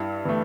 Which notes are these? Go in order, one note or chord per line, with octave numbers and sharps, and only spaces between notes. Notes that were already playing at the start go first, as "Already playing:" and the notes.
Already playing: G2 E4
E3 A3